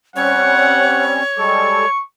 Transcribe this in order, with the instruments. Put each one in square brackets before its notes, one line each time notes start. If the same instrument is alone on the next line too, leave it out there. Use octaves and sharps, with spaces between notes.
[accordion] G3 C4 C#4 [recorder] C#5 [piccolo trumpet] F#5
[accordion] G3 G#3 A4 [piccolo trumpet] C#6